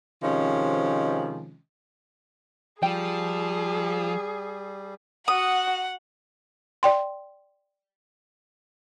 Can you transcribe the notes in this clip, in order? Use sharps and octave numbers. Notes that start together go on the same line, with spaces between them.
C3 D#3 F3 G#3 C#4
F3 G3 G4 G#4 G5
F#4 F#5 D#6
D5 G5 C6